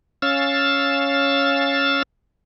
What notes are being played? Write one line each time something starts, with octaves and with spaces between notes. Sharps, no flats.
C#4 F5 E6 A6